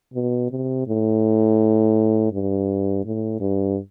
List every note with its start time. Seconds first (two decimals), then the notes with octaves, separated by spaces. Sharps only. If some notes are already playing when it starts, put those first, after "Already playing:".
0.14 B2
0.51 C3
0.88 A2
2.32 G2
3.05 A2
3.40 G2